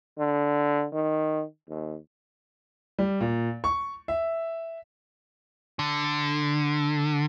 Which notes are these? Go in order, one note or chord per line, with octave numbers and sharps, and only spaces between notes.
D3
D#3
D#2
G3
A#2
C#6
E5
D3